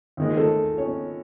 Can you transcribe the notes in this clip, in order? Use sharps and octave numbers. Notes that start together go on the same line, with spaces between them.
D#2 D#3 G#3
A3 A4
C#4 C#5